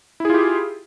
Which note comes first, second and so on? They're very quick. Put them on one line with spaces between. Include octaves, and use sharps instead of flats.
E4 G#4 F4 G4